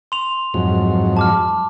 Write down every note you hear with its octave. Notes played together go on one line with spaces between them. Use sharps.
C6 F7
F2 G#2 F#3
A5 D6 F6